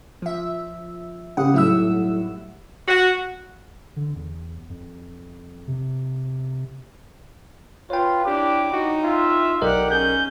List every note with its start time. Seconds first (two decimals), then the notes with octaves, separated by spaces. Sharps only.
0.22 F3 E5
1.37 C#3 G4 F#5 D#6
1.54 B1 A2 G3 E5 E6
2.88 F#4
3.96 D3
4.16 E2
4.70 F2
5.68 C3
7.90 F4 B4 C#5 G5
8.25 D4 E4 G4 D6
8.72 D#4 F#4
9.04 F4 E5
9.62 B1 G4 A#4 D5 D#5 F#5
9.91 C#4 G#4 G6